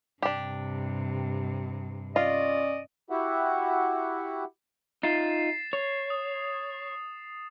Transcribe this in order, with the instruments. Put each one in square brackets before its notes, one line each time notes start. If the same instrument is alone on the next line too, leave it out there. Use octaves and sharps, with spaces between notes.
[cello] G2 C3 [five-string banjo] D4 G4
[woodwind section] C#4 D5 D#5 [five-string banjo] F4
[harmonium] E4 F#4 G4 E5 F#5
[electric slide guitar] D#4 F4 [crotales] A6 C7 E7
[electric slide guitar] C#5
[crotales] D#6